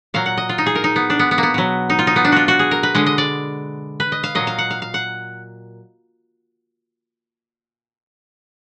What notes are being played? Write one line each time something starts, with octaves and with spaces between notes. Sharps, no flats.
A#2 F#3 F5
F#5
D#5
F4
D#4
G#4
A#4
D#4
B3
D4
B3
B3
A#3
B3
B2 F#3
D#4
F4
D#4
B3
D4
F4 F#4
F#4
G#4
A#4
B4
D3 G#3 D#5
D#5
D5
B4
D#5
F5
A#2 F#3 D#5
F5
F#5
F5
F5
F#5